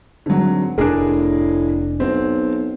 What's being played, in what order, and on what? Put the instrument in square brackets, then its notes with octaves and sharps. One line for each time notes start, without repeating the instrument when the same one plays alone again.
[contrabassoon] G#1 [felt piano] D3 F#3
[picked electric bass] F1 D4 [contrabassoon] A2 [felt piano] G#4 A#4
[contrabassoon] B1 [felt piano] C4